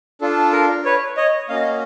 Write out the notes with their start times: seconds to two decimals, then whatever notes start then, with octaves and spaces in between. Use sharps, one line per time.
0.21 D4 F4 A4
0.52 A#4
0.85 B4 C#5
1.17 C#5 D#5
1.49 A#3 C#4 F#4 D#5 F5